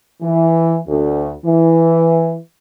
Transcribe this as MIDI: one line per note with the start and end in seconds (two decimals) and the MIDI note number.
0.22 0.77 52
0.88 1.31 38
1.46 2.37 52